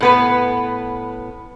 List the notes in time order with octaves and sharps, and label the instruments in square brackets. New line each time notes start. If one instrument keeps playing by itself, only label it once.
[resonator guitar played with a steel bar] A2 B3 B4